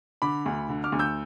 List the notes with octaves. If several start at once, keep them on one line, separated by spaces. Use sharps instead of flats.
D3 B5 D6
D2
D3
D6 F6
D2
E6 G6